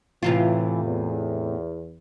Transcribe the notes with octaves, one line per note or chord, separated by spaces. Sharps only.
A2 C3 E3 F4
E2